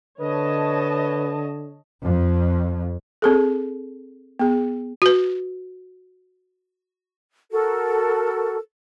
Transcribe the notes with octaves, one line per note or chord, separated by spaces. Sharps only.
D3 B4 C#5 D#5 A5
F2
C4 G#4 A4
B3 G#4
F#4 B4
F#4 A4 A#4